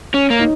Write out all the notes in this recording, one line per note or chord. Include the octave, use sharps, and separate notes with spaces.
C#4 C#5
A#3
D#4